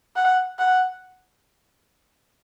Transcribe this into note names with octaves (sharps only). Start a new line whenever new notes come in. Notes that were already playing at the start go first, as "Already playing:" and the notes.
F#5
F#5